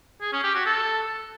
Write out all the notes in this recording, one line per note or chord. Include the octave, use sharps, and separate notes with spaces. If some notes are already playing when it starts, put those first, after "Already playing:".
G#4
C#4
G4
F#4
A4